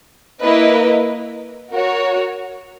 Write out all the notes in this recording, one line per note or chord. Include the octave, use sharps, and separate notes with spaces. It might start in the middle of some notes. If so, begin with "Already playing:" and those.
A#3 E4 B4 D#5
F#4 A#4 C#5